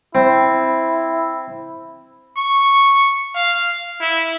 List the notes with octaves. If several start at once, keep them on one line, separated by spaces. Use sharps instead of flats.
C4 E4
C#6
F5
E4